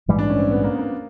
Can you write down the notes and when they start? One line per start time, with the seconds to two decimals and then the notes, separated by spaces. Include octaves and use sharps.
0.08 A#1 G#2 E3 G3
0.19 D4
0.30 C#4
0.39 C4
0.51 B3
0.64 A#3
0.74 B3
0.78 A#3